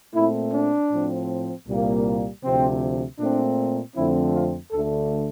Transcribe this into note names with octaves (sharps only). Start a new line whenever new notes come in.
A#2 A3 C4 E4
D4
A2 F3 C4
C2 A#2 G3 A#3
D2 C3 F3 C4
A#2 A3 C4 D4
F2 D3 F3 A3 C4 E4
F4
D2 D3 A3 A4